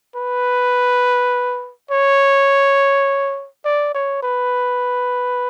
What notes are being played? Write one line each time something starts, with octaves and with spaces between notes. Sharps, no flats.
B4
C#5
D5
C#5
B4